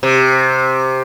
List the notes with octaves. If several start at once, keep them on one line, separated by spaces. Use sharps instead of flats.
C3